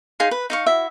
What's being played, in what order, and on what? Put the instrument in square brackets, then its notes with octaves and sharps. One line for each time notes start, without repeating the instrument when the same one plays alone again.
[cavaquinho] D#4 G#4 F5 C6
B4
D#4 F5 C#6
E4 F#4 E5